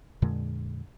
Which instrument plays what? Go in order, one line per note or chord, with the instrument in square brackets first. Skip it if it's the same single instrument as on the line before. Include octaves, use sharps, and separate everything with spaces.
[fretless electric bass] F2 A#2 D3 G#3